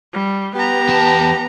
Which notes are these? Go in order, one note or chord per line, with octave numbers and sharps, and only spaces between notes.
G3
B3 G4 A#5
E2 A5